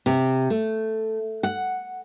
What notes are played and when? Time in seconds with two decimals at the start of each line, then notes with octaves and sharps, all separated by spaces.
0.06 C3
0.50 A3
1.43 F#5